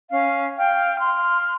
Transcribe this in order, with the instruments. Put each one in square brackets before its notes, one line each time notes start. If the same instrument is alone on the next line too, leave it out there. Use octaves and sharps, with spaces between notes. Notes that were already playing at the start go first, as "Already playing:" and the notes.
[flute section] C#4 F5
F5 G5
C6 F6